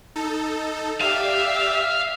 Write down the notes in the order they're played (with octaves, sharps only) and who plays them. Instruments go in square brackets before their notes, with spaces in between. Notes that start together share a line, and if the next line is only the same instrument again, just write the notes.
[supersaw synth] D#4 A4
[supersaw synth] G4 D5 [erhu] E5 [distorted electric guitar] F5